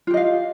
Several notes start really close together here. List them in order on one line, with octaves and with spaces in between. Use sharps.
F4 G4 D#5 F5